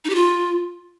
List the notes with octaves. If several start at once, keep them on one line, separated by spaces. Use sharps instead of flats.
D#4
G4
F4